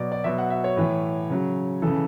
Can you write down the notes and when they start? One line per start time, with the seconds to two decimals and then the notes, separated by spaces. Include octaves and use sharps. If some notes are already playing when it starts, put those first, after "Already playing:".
Already playing: B2 F#3 D5
0.12 D5
0.24 B2 F#3 E5
0.38 F#5
0.50 E5
0.64 C#5
0.77 A2 E3
1.30 C#3 F#3
1.82 C#3 E3 A4